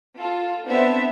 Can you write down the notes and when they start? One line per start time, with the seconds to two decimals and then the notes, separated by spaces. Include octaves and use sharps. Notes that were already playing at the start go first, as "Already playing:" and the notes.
0.19 F4 A4
0.67 B3 C4 D4 C5 E5